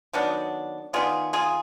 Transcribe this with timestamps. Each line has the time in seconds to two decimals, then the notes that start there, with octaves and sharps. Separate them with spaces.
0.13 D#3 F#3 B3 D4
0.93 D#3 F#3 B3 D4 F4 G#4
1.33 F4 G#4